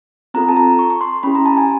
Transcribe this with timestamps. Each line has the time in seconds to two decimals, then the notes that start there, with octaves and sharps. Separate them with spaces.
0.34 C4 F4 A4 A#5
0.49 A5
0.57 A#5
0.79 C#6
0.90 C#6
1.01 C6
1.23 C#4 E4 G4 B5
1.35 A#5
1.46 A5
1.58 G#5